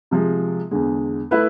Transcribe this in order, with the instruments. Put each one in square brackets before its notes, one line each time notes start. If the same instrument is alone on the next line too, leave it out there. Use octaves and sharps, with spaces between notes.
[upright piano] C3 F3 G#3
E2 D3 G#3
A3 E4 B4